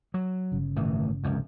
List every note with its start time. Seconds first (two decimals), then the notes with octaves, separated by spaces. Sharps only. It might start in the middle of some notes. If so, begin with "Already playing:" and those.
0.14 F#3
0.52 G1 C#3
0.76 A2 D#3 E3
1.24 F1 C#2 F#2